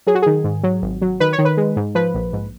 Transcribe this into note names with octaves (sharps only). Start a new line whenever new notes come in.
F#3 G#4
F#4
D#3 G#4
G#2
F#3
G#1
F#3
D#3 B4
C#5
D#3
B4
G#3
G#2
F3 B4
A#1
G#2